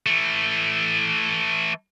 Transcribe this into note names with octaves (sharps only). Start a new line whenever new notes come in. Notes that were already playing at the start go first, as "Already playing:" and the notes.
E3 A3